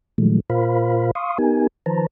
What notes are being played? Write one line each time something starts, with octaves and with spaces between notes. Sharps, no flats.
A#2 D#3 F3 F#3 G#3 A3
A#2 F4 A#4 C5 F5 B5
F5 C6 C#6 D#6
B3 D#4 G4 A#4 G#5
D#3 F3 B4 C5 A5 A#5